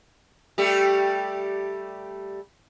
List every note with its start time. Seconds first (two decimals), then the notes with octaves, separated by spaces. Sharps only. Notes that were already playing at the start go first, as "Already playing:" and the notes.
0.58 G3 A3 G4